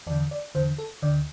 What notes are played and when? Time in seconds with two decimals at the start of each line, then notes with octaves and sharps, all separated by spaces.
0.07 E2 D5
0.10 D3
0.31 D5
0.55 E2 D3 C5
0.78 A4
1.02 D2 D3 D5